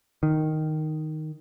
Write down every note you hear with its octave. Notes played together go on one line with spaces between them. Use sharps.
D#3